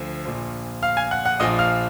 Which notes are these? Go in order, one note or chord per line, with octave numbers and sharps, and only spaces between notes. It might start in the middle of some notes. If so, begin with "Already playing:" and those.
Already playing: D2 D3 F3
A#1 A#2 F3
F5 F6
G#5 G#6
F#5 F#6
F#5 F#6
A#1 A#2 F3 D#5 D#6
F5 F6